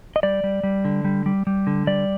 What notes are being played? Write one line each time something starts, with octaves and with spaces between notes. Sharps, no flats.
D#5
G3 D5
G3
G3
D3
G3
G3
G3
D3
G3 D5